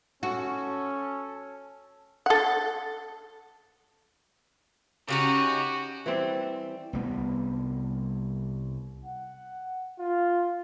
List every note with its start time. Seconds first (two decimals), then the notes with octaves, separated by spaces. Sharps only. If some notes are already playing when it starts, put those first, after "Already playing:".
0.23 C#4 F#4 A4
2.26 A4 F#5
5.08 C#3 C#4 D#4 F#4 G4
6.06 E3 G3 C4
6.93 C2 G3 B3
9.05 F#5
9.99 F4